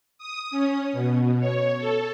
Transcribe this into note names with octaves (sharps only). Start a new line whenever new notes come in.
D#6
C#4
B2
C#5
A4